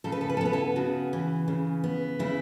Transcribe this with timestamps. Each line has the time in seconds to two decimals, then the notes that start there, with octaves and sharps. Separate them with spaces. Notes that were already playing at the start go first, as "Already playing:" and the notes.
0.04 C#3 A4
0.12 B4
0.21 A4
0.29 B4
0.37 A4
0.41 B3 B4
0.53 E4 A4
0.76 C#3 F#4
1.13 E3
1.48 C#3
1.84 B3
2.19 C#3 E4